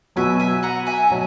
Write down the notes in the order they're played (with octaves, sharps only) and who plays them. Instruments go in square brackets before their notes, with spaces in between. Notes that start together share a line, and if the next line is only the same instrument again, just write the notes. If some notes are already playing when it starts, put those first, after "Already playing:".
[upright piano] B2 F#3 B3 F#4 [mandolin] E5 G#5
[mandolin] E5 G#5
F#5 A#5
E5 G#5
[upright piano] B2 F#3